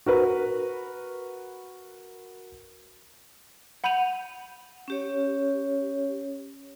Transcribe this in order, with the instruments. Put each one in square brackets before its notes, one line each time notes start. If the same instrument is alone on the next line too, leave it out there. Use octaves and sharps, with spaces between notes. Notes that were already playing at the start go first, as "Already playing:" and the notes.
[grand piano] F#4 A#4 B4
[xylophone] F#5 B5 G6 D#7 F7
[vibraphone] C#4 G4 C#5